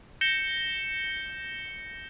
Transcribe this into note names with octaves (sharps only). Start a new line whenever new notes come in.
G6 A#6 C#7 E7 G7